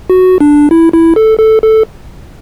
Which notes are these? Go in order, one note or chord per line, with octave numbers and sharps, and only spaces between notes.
F#4
D4
E4
E4
A4
A4
A4